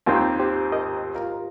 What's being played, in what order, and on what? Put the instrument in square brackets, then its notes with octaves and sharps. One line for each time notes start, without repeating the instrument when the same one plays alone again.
[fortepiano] D#2 D#3 C4 [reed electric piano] F4 A#4
[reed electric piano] G4 C5
A#4 D#5
F4 A#4